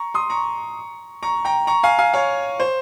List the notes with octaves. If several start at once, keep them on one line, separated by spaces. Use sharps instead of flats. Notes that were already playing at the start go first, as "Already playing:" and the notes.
Already playing: A#5 C#6
C6 D#6
A#5 C#6
A#5 C#6
G5 A#5
A#5 C#6
F5 G#5
F5 G#5
C#5 F5
C5